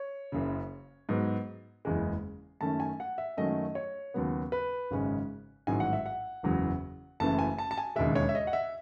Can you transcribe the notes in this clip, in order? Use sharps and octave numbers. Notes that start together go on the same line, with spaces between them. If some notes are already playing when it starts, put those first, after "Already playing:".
Already playing: C#5
F#1 F#2 C#3
G#2 F#3 B3
F#1 E2 C#3 G#3
F#2 D#3 A3 C#4 A5
G#5
F#5
E5
F#2 D#3 F#3 A3 C#4 D#5
C#5
D#2 C#3 F#3 B3
B4
G#1 F#2 C#3 G#3 C#4
A1 G#2 D#3 F#3 G#5
F#5
E5
F#5
F#1 E2 C#3 F#3
F#1 F#2 C#3 E3 A3 A5
G#5
A5
A5
G#5
E1 D#2 C#3 G#3 E5
C#5
E5
D#5
F#5
E5